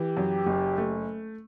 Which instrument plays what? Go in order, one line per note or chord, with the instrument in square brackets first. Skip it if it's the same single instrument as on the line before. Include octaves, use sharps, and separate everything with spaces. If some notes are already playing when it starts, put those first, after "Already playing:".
Already playing: [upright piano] E3 [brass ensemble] G4
[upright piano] F#2
F#1
A3